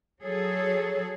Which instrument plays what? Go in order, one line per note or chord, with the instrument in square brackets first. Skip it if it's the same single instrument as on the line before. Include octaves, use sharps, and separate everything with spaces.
[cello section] F#3 G#4 A4 [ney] C#5